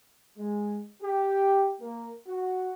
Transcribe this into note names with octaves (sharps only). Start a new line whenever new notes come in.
G#3
G4
A#3
F#4